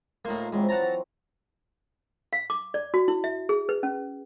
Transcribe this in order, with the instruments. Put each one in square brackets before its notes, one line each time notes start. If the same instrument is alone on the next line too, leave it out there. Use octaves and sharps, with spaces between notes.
[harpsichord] A2 A#3 [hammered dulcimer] D#4 F4 F5
[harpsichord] G#2 [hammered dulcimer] E3 F#3 C4
[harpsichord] F#5 A5 A#5
[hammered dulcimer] F#3
[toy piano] F5
D6
D5
F#4
E4
E5
G#4
B4
C#4